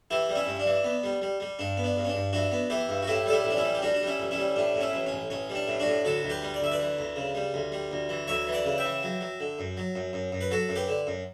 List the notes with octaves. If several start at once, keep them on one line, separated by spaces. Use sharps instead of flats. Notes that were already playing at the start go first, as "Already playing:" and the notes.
E3 E4 G4
G3
C#4 E4
G2
D4
E3
B3
G3
G3
G3
G2 D4
B3
D4
G2
C#4
D4
G2
E3 D4 F#4
B3
E3 E4 G4
G2
F#4
A2 E4 G4
G3 A4
E4 G4
A1
D4
C#4 E4
G3
G4
G3 D4 F#4
D4
G3
C#4 E4
A1
C#4 E4
G3
A2 D4
A2
C#4 E4
A1
C#4
A1
A1 C#4
G3
D4
A2
D4 F#4
A2
D2 F#4 A4
D2
G4 B4
G3
D5
D2 E5
B4 D5
E3
D2
C#3
G3
D2
G3
D2
E3
D2 C#5 E5
E3
D5 F#5
C#3
E5 G5
E3
F#3
F#3
D3
F#2
F#3
F#2
F#2
F#2
B4
F#3 F#4 A4
F#2
G4 B4
D3
F#2